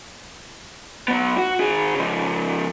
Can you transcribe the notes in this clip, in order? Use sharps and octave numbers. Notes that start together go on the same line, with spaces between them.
F#3 B3
F#4
D#3 G#4
C#3 F3